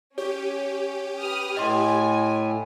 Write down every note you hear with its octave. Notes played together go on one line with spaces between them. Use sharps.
C#4 G4 C#5
B4 D#6 F6
A2 D#5 G#5 C6